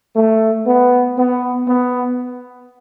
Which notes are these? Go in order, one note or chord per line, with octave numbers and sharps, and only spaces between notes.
A3
B3
B3
B3